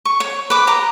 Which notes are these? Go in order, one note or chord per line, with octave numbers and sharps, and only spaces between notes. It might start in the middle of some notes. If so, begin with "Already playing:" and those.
C#6
C#5
B4 D6
G4 A#5 D#6